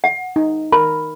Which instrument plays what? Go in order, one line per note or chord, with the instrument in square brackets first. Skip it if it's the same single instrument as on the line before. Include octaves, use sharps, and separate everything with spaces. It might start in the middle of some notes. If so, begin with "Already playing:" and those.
[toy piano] F#5
[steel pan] D#4
[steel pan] A#4 [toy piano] B5